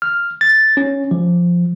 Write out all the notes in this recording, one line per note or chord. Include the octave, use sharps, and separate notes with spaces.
F6
A6
C#4
F3